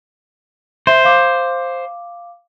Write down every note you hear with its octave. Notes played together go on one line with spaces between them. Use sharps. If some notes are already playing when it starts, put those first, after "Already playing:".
C5 E5
F5 D6